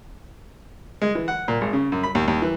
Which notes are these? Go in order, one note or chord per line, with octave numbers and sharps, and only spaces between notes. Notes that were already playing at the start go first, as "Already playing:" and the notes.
G#3
E3
F#5
A#2
G#1
C#3
F#2
B5
D#2
D#2
E3